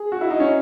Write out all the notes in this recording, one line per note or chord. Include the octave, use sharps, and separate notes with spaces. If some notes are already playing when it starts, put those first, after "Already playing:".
Already playing: G#4
F#4
E4
D#4
C#4